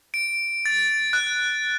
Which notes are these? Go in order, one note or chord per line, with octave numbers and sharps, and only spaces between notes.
D7
A6
F#6